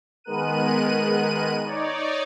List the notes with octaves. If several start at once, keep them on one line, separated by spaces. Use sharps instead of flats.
D#3 G#3 B3 A#4 F#6 D#7
D#4 C#5 D5